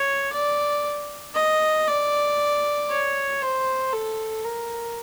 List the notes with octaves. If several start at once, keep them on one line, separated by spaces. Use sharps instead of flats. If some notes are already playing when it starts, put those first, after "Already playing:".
Already playing: C#5
D5
D#5
D5
C#5
C5
A4
A#4